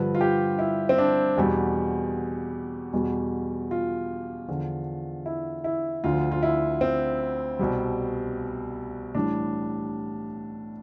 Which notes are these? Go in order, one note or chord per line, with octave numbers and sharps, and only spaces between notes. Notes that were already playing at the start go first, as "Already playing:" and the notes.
Already playing: G2 D3 F3 B4
F4
G4
E4
C4
D4
E2 B2 G3
E2 B2 G3
F4
E2 D3 F3
E4
E4
D2 D3 F3 F4
F4
E4
C4
C2 B2 G3
A2 E3 G3 D4